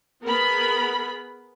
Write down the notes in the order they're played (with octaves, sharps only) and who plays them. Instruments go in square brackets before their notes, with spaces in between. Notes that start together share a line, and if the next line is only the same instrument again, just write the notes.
[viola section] B3 G#4 A#4 B5